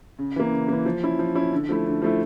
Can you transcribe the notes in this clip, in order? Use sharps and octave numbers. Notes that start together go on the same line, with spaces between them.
C#3
E3 A#3
C#3
E3 A#3
F3
C#4 E4
F3
C#4 E4
D3
F3 A3 E4
D3
F3 A3 E4